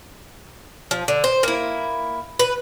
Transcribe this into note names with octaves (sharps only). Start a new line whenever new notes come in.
F3
D3
C5
A#3 E4
B4